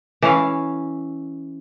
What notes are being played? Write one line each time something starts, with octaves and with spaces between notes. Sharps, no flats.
E3 C#4 F5